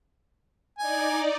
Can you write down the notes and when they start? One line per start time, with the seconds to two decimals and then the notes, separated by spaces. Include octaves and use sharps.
0.79 D#4 D5 G#5